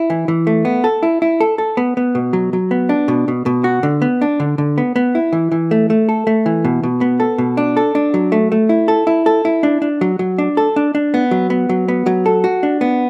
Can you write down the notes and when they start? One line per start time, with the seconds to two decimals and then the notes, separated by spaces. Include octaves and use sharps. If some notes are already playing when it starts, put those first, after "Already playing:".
Already playing: E4
0.10 E3
0.28 E3
0.47 A3
0.65 B3
0.84 A4
1.03 E4
1.22 E4
1.40 A4
1.58 A4
1.77 B3
1.97 B3
2.15 B2
2.33 F#3
2.53 F#3
2.71 B3
2.89 D4
3.08 B2
3.28 B2
3.46 B2
3.64 F#4
3.83 D3
4.02 B3
4.21 D4
4.40 D3
4.58 D3
4.78 B3
4.96 B3
5.15 E4
5.33 E3
5.52 E3
5.71 A3
5.90 A3
6.09 A4
6.27 A3
6.46 E3
6.65 B2
6.83 B2
7.01 B3
7.20 A4
7.38 B2
7.57 D4
7.77 A4
7.95 D4
8.14 F#3
8.32 A3
8.52 A3
8.69 E4
8.88 A4
9.07 E4
9.26 A4
9.45 E4
9.63 D4
9.82 D4
10.01 F#3
10.19 F#3
10.38 D4
10.57 A4
10.76 D4
10.95 D4
11.14 B3
11.31 F#3
11.50 B3
11.69 F#3
11.88 B3
12.06 F#3
12.26 A4
12.44 F#4
12.63 D4
12.81 B3